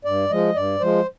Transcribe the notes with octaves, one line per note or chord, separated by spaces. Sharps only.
G2 D5
F3 G#3 D#5
G2 D5
F3 G#3 C5